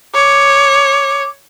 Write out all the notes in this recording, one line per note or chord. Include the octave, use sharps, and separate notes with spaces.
C#5 D6